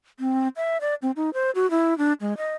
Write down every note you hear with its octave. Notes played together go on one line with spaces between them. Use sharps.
C4
E5
D5
C4
D#4
C5
F#4
E4
D4
G#3
D#5